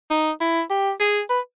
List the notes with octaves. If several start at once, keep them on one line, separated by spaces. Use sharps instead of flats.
D#4
E4
G4
G#4
B4